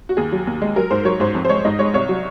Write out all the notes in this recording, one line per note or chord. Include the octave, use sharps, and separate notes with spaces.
F#4
D#2 G#4
F#3
D#2
G#3
F#3 A#4
G#2 C5
F#3 C#5
G#2 C5
F2
C5
G#3 C#5
G#2 D#5
G#3 C#5
C2 C#5
F#3